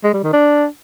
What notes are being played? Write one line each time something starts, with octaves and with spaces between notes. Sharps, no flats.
G#3
G3
D#3
D4